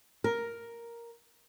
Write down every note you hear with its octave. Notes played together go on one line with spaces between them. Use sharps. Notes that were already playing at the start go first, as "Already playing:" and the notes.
A#4